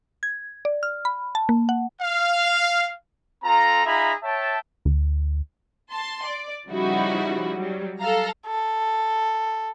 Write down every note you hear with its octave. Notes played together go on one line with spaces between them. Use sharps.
G#6
D5
F6
B5
A5
A#3
F#5
F5
C4 F4 A4 A#5
D#4 F4 G#4 E5 A#5 B5
C#5 E5 G5 A5
D2
A5 C6
D5
C#3 F3 G3 D#4 E4 F#4
F#3 G3
A4 F5 A#5
A4